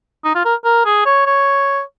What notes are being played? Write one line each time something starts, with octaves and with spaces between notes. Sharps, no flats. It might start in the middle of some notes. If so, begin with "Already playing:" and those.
D#4
F4
A#4
A#4
G#4
C#5
C#5